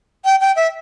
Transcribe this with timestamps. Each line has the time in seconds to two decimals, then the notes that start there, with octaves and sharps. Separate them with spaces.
0.25 G5
0.41 G5
0.56 E5